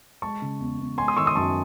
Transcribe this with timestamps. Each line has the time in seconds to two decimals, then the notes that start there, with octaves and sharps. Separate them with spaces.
0.22 G#3 A5 C#6
0.42 C#3
0.60 E2
0.79 E2
0.98 G#3 G#5 C6
1.08 C6 D#6
1.17 D#3 C#6 E6
1.26 C6 D#6
1.36 F#2 A5 C#6